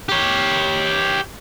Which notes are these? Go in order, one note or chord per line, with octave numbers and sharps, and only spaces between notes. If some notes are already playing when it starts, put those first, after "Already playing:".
G4 C#5